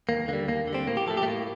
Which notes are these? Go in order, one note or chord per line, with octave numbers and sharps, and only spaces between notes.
D#2 A#3
D3 G3 A#3
D#2 A#3
D3
G3 C4
A2 A#3
G4
F3 A3 A4
G4
A3
A2 A#3